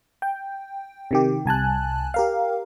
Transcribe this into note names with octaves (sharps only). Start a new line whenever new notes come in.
G5
C3 D#3 G4
C2 G#5 A5 F#6
G4 A#4 F5